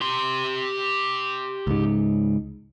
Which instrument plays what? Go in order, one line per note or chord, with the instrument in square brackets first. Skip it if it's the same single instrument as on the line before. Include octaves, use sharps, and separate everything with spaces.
[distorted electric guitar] G4 C6
[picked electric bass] C#2 G#2